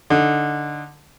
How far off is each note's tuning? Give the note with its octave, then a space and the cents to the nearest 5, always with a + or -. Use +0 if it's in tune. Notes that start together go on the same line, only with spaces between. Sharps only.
D3 +0 D#4 +0